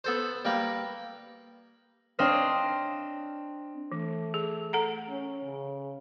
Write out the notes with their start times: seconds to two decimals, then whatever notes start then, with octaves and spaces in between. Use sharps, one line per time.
0.04 B3 A4 C5
0.45 G3 A#3 B4
2.19 C4 D4 C#5 D#5 F5
3.92 E3 A3
4.34 G#4
4.73 A4 F#5 A#5
5.09 C#4
5.44 C#3